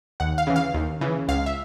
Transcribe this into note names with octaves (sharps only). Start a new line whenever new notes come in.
D#2 F#5
F5
C#3 E3
F5
D#2
C#3 E3
C#2 F5
E5